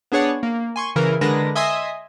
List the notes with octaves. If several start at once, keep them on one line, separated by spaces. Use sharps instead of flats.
B3 D4 G#4 C#5 F#5 A5
A#3
G#5 C6 C#6
C#3 E3 A#4
D3 G#3 A#4 B4 A5 A#6
D#5 E5 G#5 C6 D#6